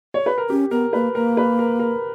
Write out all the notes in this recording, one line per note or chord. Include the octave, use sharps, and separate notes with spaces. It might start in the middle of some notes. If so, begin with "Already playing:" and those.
C#5
B4
A#4
C#4 G4
B3 A#4
A#3 B4
A#3 A#4
B4
A#4
A#4